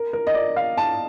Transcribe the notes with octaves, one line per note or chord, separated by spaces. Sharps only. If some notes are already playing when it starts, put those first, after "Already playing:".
Already playing: A#4
A#4
D#5
D5
F5
A5